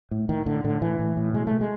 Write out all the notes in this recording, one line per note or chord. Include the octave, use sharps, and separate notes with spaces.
A2
A2 D#3
A2 D3
A2 D3
A2 E3
A2
A2
B2 G#3
B2 A3
G#3